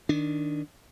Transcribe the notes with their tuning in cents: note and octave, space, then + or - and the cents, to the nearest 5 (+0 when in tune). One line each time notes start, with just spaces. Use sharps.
D#3 +0 D4 +0